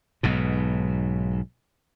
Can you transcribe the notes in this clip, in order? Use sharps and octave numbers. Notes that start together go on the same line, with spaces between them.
B1 G#2 B2